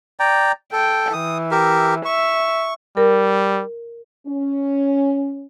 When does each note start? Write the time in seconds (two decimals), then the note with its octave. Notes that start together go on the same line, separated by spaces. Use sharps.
0.20 D5 G5 A#5
0.73 A4 G5
1.13 E3 D#6
1.51 G4 A#4 E5
2.05 E5 C#6
2.97 G3 A#4
4.26 C#4